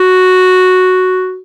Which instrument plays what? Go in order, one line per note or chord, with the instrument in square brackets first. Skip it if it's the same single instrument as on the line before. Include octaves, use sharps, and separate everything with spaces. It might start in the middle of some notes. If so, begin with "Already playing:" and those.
Already playing: [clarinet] F#4